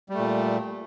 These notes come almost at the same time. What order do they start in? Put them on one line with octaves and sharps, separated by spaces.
G3 A3 A#2